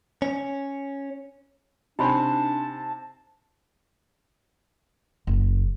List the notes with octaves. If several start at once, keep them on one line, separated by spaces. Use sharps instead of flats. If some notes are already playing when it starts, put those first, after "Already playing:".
C#4
C3 D4 D#4 C5 G#5 A5 B5 C6
F#1